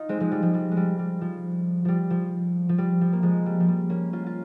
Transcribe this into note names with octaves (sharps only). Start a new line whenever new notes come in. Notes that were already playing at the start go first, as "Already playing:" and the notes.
Already playing: D#4 F4
G#3 C4
F3 G#3
G3
F3
G3
G#3
G3
G3
F3
F3 G3
F3
F3
G3
F3
A#3
F3 G#3
G3
F3
G3
A#3 C#4
C#4 F4
F4